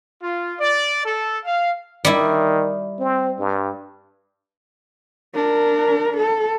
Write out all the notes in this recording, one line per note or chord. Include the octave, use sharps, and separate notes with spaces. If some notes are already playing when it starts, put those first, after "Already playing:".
F4
D5
A4
F5
D#3 G3 E4
C4
G2
D4 A#4
A4